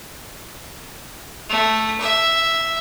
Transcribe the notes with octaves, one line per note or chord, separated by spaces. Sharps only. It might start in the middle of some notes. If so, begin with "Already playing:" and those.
A3
E5